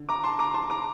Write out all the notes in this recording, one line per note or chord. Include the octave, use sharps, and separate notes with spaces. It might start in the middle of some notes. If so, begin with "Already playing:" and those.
Already playing: D3
A#5 D6
A5 C6
A#5 D6
A5 C6
A#5 D6